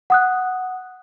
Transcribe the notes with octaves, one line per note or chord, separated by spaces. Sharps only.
F#5 D#6 F#6